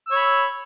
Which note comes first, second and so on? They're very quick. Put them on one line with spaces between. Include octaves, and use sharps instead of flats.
E6 C#5 B5